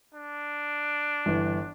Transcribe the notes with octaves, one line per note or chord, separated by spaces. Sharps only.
D4
G1 E3